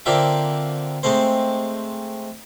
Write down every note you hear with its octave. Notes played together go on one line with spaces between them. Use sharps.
D3 A#3 C4 F4 E5 G5
G#3 A3 C4 C5